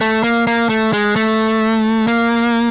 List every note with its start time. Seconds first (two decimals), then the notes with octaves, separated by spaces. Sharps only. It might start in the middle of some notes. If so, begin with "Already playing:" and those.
0.01 A3
0.24 A#3
0.47 A#3
0.69 A3
0.93 G#3
1.16 A3
2.07 A#3